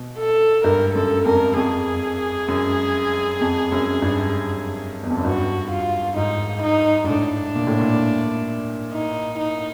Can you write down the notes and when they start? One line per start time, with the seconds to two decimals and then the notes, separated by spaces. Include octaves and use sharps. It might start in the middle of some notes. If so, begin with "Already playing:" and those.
Already playing: B2
0.18 A4
0.64 G2 A#4
0.95 F#2 A4
1.25 F2 A#4
1.56 F2 G#4
2.48 F#2
3.41 F2
3.72 F#2
4.02 G2
5.03 E2
5.10 F2
5.17 F#2
5.24 G2 F#4
5.71 F4
6.16 G#2 D#4
6.62 D#4
7.04 G#2
7.09 A2 D4
7.56 A#2
7.67 A2
7.80 A#2
8.93 D#4
9.39 D#4